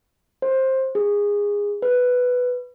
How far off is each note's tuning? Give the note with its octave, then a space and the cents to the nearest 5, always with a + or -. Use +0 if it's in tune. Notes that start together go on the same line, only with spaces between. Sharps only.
C5 +15
G#4 -20
B4 +5